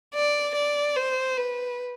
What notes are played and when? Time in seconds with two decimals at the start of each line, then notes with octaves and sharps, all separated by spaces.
0.14 D5
0.55 D5
0.96 C5
1.37 B4